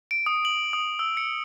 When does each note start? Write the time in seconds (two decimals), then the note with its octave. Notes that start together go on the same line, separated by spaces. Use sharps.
0.11 D7
0.26 D#6
0.45 F#7
0.73 D#6
0.99 E6
1.17 C#7